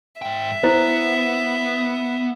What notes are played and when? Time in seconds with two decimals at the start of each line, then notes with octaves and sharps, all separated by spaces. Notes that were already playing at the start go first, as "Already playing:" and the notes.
0.22 G#2 E5 G5
0.63 B3 E4 C5